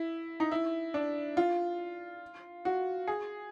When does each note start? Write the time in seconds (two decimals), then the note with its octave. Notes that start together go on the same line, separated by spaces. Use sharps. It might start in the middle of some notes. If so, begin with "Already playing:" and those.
Already playing: E4
0.40 D#4
0.52 E4
0.94 D4
1.37 F4
2.65 F#4
3.07 G#4